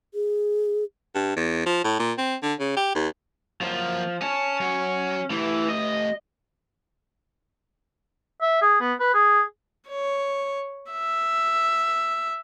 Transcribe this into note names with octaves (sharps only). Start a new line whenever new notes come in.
G#4
G2
E2
F3
A2
A#2
C4
D3
C#3
G4
D#2
F3 F#3 A#3
C#4 A5
F#3
E3 A3 G4
D#5
E5
G#4
B3
B4
G#4
C#5
E5